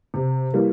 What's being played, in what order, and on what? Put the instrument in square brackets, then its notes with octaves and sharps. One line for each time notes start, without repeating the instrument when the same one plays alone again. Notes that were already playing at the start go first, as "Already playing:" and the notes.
[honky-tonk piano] C3
E3 G3 A#3